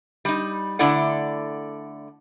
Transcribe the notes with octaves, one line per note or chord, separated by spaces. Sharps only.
G3 D#4
D3 A3 E4 D5 F#5